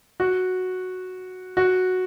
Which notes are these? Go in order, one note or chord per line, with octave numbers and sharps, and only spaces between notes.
F#4
F#4